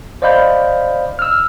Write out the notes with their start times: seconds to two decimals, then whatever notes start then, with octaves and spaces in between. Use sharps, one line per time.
0.22 C5 D5 D#5 F5 B5 G6
1.19 E6 F6